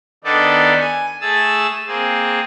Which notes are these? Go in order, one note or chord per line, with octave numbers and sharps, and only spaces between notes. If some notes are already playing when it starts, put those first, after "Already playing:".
D#3 B3 D4 D#4 A4 D5
G#5
A3 G#4 A5 E6
A#3 C4 G#4